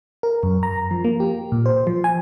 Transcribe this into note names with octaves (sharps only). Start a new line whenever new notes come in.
A#4
F#2
A#5
F3
A#3
G4
A#2
C5
F3
G#5